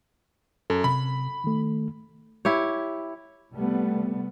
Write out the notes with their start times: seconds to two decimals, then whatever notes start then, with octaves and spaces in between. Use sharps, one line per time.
0.70 F#2 A4
0.84 C3 B5
1.44 D#3 A3
2.45 E4 G4 C#5
3.53 C3 G3 A3 B3